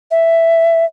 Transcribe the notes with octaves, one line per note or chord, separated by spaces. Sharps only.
E5